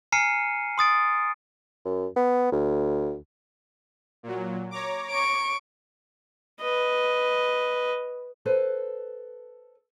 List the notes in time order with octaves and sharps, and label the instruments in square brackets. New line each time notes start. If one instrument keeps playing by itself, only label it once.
[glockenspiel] G#5 A#5 F6 C7 C#7 D#7
C6 D#6 A6 D7
[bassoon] F#2
B3
D2
[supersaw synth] A#2 F#3
C#5 A#5 D6
[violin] C#6 D7
[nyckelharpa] B4 D#5
[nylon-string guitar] A4 B4 C5